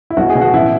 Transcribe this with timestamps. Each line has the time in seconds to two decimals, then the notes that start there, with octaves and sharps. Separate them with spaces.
0.10 E4
0.17 B1 F#4
0.30 G#4
0.35 B2
0.41 F#4
0.53 A1 E4